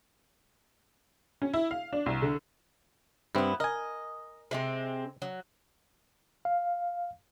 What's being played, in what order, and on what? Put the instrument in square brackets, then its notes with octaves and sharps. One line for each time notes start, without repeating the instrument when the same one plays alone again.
[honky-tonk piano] C#4
E4
F5
D4
C2
D3
[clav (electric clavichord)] G2 C4 [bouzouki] B3 E4
[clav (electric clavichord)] A#4 G#5 [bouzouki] D#5
[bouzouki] C3 G#3 C4
F#3
[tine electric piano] F5